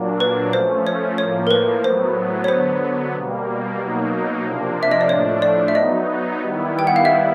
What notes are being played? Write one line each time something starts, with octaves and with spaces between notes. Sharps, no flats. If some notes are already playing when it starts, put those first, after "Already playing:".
Already playing: A#2 F#3 A#3 D4
B4
F3 A3 C#4 C5
C#5
A2 F3 A#3 C#5
A#4
B4
A2 F#3 B3 C5
C#5
D3 F#3 B3 C5
B2 G3 A#3
B2 F#3 A#3 D#4
C3 F3 A#3 D4
E5
D#5
D5
A2 F3 A3 D4 C#5
D5
E5
F#3 B3 D#4 D#5
D#3 G3 B3 E4
G5
F#5
F5
E5